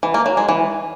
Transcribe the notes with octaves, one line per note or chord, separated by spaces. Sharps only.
E3
A#3
F#3
G#3
E3